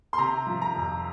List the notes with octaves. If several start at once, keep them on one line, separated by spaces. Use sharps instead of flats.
C6
C3 A#5
F3
A#5
F2